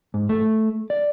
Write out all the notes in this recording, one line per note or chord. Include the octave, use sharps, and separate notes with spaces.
G#2
A3
D5